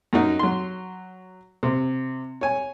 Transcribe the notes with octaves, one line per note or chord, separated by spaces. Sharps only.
F#2 F#3 D#4
F#3 C6
C3
C#5 G#5